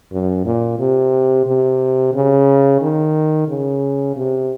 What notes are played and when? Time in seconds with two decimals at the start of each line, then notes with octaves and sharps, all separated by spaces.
0.12 F#2
0.45 A#2
0.79 C3
1.47 C3
2.14 C#3
2.82 D#3
3.49 C#3
4.16 C3